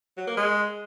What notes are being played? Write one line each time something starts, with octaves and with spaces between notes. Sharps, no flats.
F#3
A#3
G#3